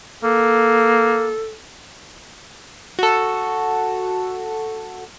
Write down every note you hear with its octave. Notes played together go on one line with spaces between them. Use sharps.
A#3 A4
F#4 A4